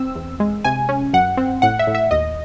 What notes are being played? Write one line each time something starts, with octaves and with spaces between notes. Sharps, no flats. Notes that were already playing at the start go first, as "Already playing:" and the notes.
Already playing: C4 E6
E2
G#3
C3 G#5
C#4
F#2 F#5
C4
A2 F#5
E5
A2
E5
D#2 D#5